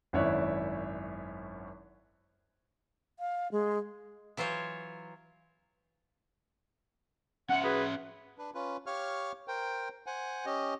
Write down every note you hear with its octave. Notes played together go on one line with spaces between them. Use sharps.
G#1 F#2 E4 C#5 D5 F#6
F5
G#3
E3 F#3 F4 C5 C#5
C#4 E5 F#5
F#4 G#4 B4
D4 B4
C#4 F4 B4
G4 C#5 F5 C#6 F6
A#4 C5 G5
C5 F#5 G#5
C#4 G4 D#5